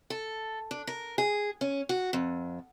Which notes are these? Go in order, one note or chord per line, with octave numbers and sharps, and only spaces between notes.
A4
D4
A#4
G#4
C#4
F#4
F2